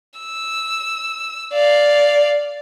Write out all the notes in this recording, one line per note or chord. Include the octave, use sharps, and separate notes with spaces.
E6
D5 F5